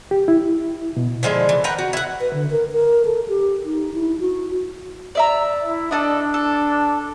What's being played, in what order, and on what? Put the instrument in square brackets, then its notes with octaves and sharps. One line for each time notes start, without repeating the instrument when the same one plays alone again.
[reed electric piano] G4
E4
B2
[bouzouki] D3 F3 G#3 E4
E3
A#4 B4 F#5 G5
F#4
E4 F#5
[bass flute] B4
D3
A#4
A#4
A4
G4
D#4
E4
F#4
[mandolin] D5 E5 A#5
[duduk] E4
[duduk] D4 [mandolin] A4 D5 D#5
[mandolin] A4